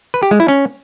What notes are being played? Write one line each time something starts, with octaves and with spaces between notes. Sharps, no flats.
B4
G4
G#3
E4
C#4